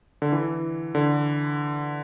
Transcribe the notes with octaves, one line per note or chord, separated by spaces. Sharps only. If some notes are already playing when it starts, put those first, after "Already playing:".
D3
E3
D3